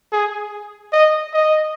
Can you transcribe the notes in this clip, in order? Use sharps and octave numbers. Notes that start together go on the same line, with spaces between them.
G#4
D#5
D#5